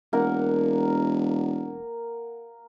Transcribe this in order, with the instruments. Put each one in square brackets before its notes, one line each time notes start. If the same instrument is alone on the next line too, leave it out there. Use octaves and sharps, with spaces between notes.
[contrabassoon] E1 [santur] A#3 A#4 F#5